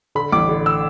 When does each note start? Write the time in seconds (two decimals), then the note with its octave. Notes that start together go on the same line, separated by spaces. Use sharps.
0.15 D3 B5
0.32 A1 D6
0.49 D3
0.66 E6